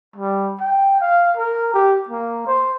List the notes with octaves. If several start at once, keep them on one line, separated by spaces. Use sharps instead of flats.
G3
G5
F5
A#4
G4
A#3
C5